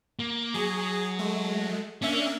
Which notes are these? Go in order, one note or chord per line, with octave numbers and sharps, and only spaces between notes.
A#3
F#3 G#4
G#3 A3
A#3 C#4 D4 E5